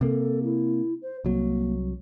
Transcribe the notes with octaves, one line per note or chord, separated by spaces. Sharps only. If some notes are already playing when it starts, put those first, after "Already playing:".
C3 A#3 A4
E4
C5
C2 F#3 A#3